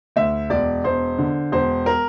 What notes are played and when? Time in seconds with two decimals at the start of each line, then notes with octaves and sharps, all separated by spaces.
0.16 D2 E5
0.50 E1 D5
0.84 E1 C5
1.18 D3
1.52 E1 C5
1.86 A#4